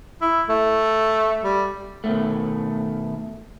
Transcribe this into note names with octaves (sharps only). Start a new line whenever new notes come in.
E4
A3
G3
B2 D#3 A3